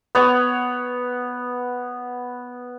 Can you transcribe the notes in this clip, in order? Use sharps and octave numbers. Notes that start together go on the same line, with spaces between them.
B3 C#5